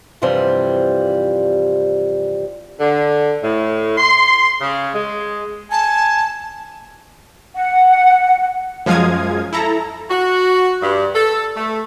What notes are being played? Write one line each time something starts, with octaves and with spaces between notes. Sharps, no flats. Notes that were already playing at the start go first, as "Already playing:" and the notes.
G2 C3 E3 F3 G3 C4
D3
A2
C6
C#3
G#3
G#5 A5
F#5
F#2 F3 G#3 F5 D#6 G#6
E4 A4 A#5
F#4
G2
A4
A3